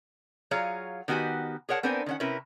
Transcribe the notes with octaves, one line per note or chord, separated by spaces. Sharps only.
F#3 F4 G#4 C#5 F5 A#5
D#3 B3 F#4 G4 G#5
G#4 A#4 C#5 F#5 A5
B3 C4 D4 A#4 C5 G#5
D#3 C#4 F#5
C3 C#4 E4 A#4 B4